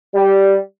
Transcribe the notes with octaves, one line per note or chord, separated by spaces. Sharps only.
G3